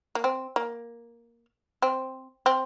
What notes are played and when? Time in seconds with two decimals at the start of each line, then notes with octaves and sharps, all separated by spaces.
0.15 A#3
0.24 C4
0.56 A#3
1.82 C4
2.46 C4